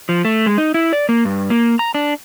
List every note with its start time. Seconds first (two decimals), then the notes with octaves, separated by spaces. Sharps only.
0.09 F3
0.25 A3
0.46 G#3
0.58 D#4
0.74 E4
0.93 D5
1.09 A#3
1.25 G2
1.50 A#3
1.79 A#5
1.95 D4